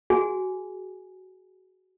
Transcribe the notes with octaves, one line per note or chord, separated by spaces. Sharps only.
F#4 G#4 G#5